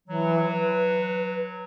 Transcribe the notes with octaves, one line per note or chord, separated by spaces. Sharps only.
E3 F#3
B4